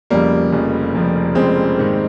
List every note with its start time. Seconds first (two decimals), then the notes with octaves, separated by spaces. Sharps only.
0.10 F1 F2 C#3 F3 G3 A#3
0.52 F1 F2 C#3 F3
0.94 F1 F2 C#3 F3
1.35 F1 F2 C#3 F3 G#3 C4
1.78 G#2 D#3 A#3